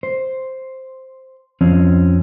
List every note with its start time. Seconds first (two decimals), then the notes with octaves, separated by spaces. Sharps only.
0.03 C5
1.61 F2 F3 C4 C#4